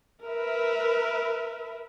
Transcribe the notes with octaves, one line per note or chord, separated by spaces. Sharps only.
A#4 B4 E5